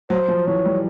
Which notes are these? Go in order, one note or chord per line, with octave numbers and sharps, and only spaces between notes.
F#3 C5
F3
E3 C#5
G3